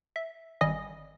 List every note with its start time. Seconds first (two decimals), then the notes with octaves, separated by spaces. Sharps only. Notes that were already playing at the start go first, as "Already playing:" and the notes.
0.16 E5
0.61 G#1 G3 D#5 G#5 D#6